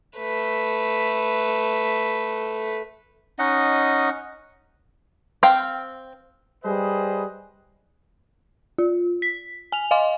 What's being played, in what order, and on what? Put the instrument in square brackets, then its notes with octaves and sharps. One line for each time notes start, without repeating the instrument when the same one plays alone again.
[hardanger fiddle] A3 B4
[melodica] C#4 D#4 D#5 F#5
[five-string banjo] C4 F5 G5
[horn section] G3 G#4 B4 C5 D#5
[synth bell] F4
B6
G#5 F7
D#5 F5 G#5 C6